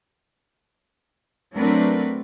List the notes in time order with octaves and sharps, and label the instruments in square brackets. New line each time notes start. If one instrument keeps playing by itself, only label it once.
[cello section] F#3 A3 C4 D4 A#4 B4